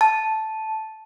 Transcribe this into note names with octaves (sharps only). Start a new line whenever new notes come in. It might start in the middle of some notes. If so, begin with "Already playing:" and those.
A5